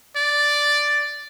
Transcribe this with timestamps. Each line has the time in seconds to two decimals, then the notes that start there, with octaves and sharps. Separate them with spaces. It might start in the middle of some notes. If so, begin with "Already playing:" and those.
0.16 D5